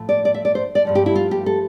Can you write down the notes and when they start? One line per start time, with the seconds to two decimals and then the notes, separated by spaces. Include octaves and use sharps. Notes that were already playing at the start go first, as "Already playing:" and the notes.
Already playing: A2 F3 A3
0.09 D5
0.25 D5
0.34 E5
0.45 D5
0.55 C5
0.75 D5
0.85 G2 F3 A3
0.95 G4
1.06 E4
1.15 F4
1.31 G4
1.46 A4